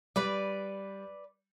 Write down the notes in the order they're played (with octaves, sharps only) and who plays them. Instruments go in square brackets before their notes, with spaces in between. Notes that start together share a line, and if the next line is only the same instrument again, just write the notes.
[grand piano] G3 [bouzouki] B4 D5